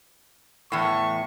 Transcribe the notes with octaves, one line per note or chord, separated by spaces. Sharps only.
E2 A2 C#6